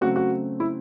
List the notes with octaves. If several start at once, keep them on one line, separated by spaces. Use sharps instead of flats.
C#3 F#3 A3 C4 F#4
F#4
E4